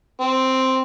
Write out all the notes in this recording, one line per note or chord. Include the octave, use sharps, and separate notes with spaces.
C4